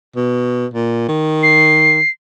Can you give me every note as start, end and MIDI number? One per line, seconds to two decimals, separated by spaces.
0.16 0.66 47
0.74 1.08 46
1.09 2.00 51
1.43 2.10 96